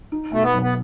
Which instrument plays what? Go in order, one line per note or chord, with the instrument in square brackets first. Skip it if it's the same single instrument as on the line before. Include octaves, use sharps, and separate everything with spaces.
[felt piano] D#4
[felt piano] B2 [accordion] A3
[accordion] B3
[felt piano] B1
[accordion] B3